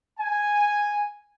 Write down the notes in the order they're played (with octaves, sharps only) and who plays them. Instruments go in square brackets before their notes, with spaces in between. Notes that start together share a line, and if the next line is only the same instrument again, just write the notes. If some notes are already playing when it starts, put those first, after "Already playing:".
[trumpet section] G#5